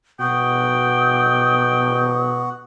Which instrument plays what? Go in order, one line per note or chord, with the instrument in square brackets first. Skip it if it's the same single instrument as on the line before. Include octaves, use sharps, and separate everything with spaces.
[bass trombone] B2 [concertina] F#4 [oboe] G5 [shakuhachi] D#6